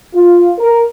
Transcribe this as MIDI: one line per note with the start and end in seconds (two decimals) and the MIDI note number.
0.15 0.51 65
0.58 0.81 70